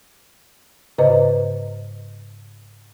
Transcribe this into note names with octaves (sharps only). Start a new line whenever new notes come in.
G#2 C#3 B4 C5 D#5 A#5